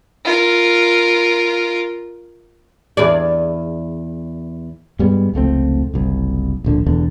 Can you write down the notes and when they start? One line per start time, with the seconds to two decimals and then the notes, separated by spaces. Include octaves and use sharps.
0.25 F4 A#4
2.97 E2 G#4 D5
4.99 G2 G3 G#3 B3
5.34 F1 C#2 A3 C4
5.94 F#1 C2
6.64 D1 A#1 D3
6.86 E1 E2 D3